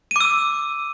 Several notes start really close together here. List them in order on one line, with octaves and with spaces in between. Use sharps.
D#7 D6 E6